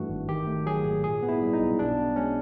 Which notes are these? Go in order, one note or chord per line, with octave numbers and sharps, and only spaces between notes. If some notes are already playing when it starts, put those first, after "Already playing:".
Already playing: G2 E3 A3 F#4
G#1
D#3 G4
A3
F#3 G#4
G#2
A#2 G#4
B3
E4
G3
D#4
B1
B2 D4
B3
G#3 C#4